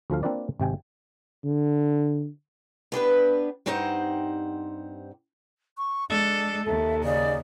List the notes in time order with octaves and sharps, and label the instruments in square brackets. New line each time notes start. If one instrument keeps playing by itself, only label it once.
[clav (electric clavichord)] D2 F3 A4 F5
A#3 C4 D4 F4 B4 D5
G#1 C3 G5 G#5
[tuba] D3
[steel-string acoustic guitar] B3 D4 G4 B4
G2 C4 D#4 G4 C5 F#5
[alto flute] C#6
[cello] G#3 A4 [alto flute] D4
[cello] D#2 [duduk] A4 [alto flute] E5
[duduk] C#3 [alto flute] D#4 [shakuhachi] D5